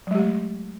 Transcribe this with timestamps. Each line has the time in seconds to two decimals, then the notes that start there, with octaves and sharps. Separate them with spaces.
0.07 F#3
0.11 G#3
0.15 G4
0.19 A3